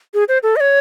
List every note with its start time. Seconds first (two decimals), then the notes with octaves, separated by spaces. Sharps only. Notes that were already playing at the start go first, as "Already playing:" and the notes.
0.14 G#4
0.28 C5
0.43 A4
0.56 D#5
0.60 C#5